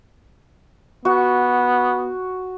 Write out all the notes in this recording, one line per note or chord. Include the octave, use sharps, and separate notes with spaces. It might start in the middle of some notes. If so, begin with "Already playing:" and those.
B3 F#4